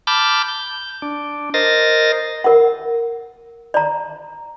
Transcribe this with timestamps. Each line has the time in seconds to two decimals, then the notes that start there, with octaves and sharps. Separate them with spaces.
0.07 A5 B5 D6 F6 G6
0.48 G6
1.02 D4
1.54 A#4 C5 D#5 A6 A#6
2.44 A#4 F#5
3.74 D5 A#5